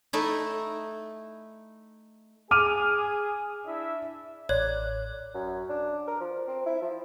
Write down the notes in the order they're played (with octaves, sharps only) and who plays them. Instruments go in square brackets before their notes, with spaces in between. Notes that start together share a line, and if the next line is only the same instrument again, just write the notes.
[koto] A3 D#4 E4
[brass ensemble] G#4 [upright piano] D6 F6 D#7
[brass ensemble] D4 E4 E5
[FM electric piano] A1 D5 F#6 [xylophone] C#5
[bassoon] F#2
D4
A#4
F3
C4
E4
F3